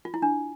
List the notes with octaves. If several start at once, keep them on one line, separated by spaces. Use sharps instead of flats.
F4
E4
D4